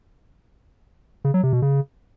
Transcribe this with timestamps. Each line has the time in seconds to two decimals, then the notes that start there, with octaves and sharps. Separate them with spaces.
1.25 C#3
1.34 F#3
1.43 C3
1.53 B2
1.62 C#3